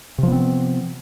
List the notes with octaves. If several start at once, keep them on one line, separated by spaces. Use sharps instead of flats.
C3 F3 B3 C4